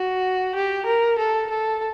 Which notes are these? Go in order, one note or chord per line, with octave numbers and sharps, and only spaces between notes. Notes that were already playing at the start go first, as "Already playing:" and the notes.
Already playing: F#4
G4
A#4
A4
A4